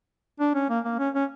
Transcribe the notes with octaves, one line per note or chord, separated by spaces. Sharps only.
D4
C#4
A#3
A#3
C#4
C#4